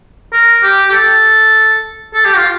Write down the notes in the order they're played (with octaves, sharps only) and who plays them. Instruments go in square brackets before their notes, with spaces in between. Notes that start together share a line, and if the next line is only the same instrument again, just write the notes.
[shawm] A#4
G4
G4
A4
A4
G4
F4